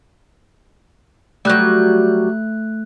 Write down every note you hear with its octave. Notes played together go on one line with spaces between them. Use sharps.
F#3 G3 A3 F#6